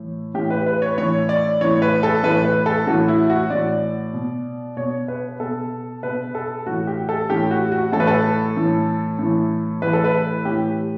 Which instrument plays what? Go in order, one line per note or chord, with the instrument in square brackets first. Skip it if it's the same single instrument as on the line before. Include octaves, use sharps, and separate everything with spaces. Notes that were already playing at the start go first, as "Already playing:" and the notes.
Already playing: [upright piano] A2 E3
A2 E3 G4
B4
B4
C#5
A2 E3 C#5
D5
A2 E3 C#5
B4
A4
A2 E3 B4
B4
A4
A2 E3 F#4
E4
F#4
A2 E3 D5
B2
B2 C#5
B4
B2 A4
B2 B4
A4
A2 E3 F#4
G4
A4
A2 E3 G4
F#4
F#4
A2 A4
E3 B4
A4
A2 E3
A2 E3
A2 E3 B4
A4
B4
A2 E3 G4